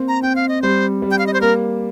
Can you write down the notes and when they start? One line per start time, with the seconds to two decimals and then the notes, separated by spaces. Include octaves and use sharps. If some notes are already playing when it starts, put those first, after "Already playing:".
Already playing: A#3 C4
0.08 A#5
0.23 C4 G5
0.36 F5
0.49 D#5
0.62 G3 C5
1.02 G3
1.11 G5
1.19 F5
1.27 D#5
1.34 C5
1.41 A#3 A#4